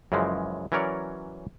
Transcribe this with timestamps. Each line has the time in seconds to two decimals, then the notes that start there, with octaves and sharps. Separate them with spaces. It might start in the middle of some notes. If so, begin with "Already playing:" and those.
0.12 F#2 C#3 E3 F3 G#3
0.72 E3 F#3 C#4 A#4 C#5 D5